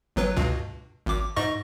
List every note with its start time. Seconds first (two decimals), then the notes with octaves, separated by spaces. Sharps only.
0.16 G1 F#3 B4
0.37 C#2 G2 B2
1.06 G#1 D6
1.36 G#2 D#5 C#6